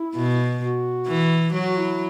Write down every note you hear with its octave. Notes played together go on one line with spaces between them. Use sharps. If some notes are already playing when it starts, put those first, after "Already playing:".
Already playing: E4
B2
F#4
E3
F#3 F#4
E4